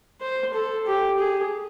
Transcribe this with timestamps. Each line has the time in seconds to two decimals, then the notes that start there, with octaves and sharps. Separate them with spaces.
0.21 C5
0.54 A4
0.87 G4
1.19 G#4